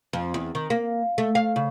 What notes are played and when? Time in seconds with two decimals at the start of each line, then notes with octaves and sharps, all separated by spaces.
0.13 F2
0.34 E2
0.55 D#3
0.70 A#3
1.18 A3
1.35 F5
1.56 C#3